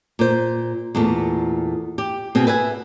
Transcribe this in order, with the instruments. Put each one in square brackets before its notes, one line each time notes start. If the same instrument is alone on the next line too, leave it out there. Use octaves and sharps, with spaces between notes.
[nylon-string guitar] A#2 C5
E2 A#2 A3
G4
B2 C4 G#4
B4 E5 F#5 G#5